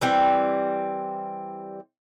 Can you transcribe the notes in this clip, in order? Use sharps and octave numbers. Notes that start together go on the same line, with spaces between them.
E3 G3 C4